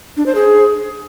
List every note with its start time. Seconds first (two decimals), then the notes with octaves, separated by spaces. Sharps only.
0.17 D4
0.26 C5
0.35 G#4